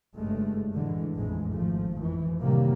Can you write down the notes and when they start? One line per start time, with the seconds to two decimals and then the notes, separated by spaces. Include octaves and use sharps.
0.16 F#1 G2 G#3 A3
0.74 A2 D3 E3 G#3
1.17 A1 F2 A2 E3 G#3
1.52 G#1 F3 A3
1.99 F2 E3
2.41 A2 C3 D#3 F#3 G3 A#3